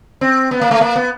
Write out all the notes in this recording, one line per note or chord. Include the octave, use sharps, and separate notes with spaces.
C4
B3
A#3
A3
A#3
B3